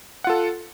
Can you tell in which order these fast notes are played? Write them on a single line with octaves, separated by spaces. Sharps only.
F#5 F4 A4